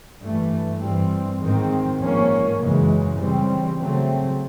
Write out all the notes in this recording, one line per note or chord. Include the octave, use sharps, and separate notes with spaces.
G2 E3 A3
G2 E3 G3 C4
G#2 D#3 G#3 C4
G#2 F3 A#3 C#4
F#2 C#3 E3 G#3
C#3 E3 G3 C4
C#3 F#3 A3 C4